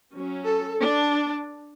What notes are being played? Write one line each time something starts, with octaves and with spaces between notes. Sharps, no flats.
F#3 C#4
A4
D4